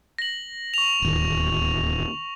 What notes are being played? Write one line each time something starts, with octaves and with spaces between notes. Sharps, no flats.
A#6 F#7
C#6 F7
D1 D#2